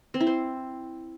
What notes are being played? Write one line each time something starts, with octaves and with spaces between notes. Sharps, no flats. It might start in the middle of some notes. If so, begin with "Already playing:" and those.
C4
E4
C5